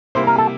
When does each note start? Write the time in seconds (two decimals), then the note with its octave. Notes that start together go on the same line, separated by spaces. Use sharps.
0.15 C3 G3 A#3 E4 C5
0.27 A#4
0.38 A4